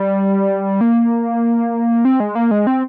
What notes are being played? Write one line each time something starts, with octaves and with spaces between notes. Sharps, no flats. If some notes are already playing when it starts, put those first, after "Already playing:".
Already playing: G3
A#3
C4
G#3
A#3
G#3
C4